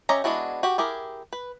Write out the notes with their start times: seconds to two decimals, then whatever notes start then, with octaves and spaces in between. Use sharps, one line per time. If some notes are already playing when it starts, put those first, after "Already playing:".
0.09 C#4 G4 D#5 E5 A#5
0.24 G#3 B3 D4 E4 F#4
0.63 F#4 G4
0.78 E4 G4 G#4 A#4
1.33 B4